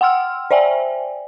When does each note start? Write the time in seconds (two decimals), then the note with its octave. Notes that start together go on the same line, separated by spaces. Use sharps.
0.01 F#5 G5 C6 E6 F6
0.51 C5 D5 E5 G5 G#5